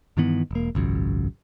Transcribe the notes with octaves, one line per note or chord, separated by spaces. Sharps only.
G2 D#3 E3 B3
E1 A#3
G#1 C#2 F#2